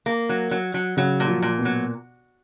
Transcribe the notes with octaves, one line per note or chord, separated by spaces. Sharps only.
A#3
F#3
F#3
F#3
C#3 F#3
A#2
F3
A#2
B2
F#3